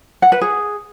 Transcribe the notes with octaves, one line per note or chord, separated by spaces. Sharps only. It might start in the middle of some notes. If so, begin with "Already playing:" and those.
F#5
B4
G#4